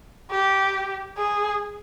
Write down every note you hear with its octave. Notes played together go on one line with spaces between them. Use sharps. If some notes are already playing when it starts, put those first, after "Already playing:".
G4
G#4